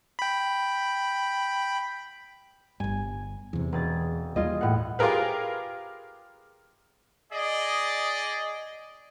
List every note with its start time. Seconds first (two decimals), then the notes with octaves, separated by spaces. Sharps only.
0.19 G5 B5
2.80 G1 G2 G#5
3.53 E2 C3
3.72 E1 G#4 A6
4.36 D#2 G3 F4 G#4 D#5
4.61 A2 F#5
4.99 F4 G4 G#4 A#4 B4
7.32 G#4 D5 D#5